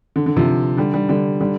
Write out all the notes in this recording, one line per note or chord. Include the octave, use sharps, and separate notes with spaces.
D3
D3
C3 F3
D3 G3
D3 G3
D3 G3
D3 G3